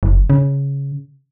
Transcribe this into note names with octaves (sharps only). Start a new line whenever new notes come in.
F#1
C#3